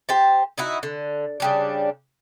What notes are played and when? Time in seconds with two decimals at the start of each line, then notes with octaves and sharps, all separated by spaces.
0.09 G4 C5 A5
0.58 D#4 E4 F#4
0.83 D3
1.40 C#3 G3 D4